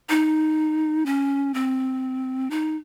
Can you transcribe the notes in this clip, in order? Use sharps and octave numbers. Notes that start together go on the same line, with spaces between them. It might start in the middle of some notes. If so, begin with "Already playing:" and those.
D#4
C#4
C4
D#4